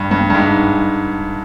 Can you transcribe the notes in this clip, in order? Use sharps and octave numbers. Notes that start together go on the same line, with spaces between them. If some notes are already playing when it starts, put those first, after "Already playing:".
Already playing: G2
G2
G2
G#2